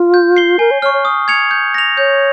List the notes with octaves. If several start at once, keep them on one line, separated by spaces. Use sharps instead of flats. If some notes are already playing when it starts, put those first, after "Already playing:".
Already playing: F4
G6
C7 G7
A#4 G#5
C#5
C#5 C#6 F6
C#5
D#6
G#6 C#7 F7
G6
A#6 F7
C#5 G6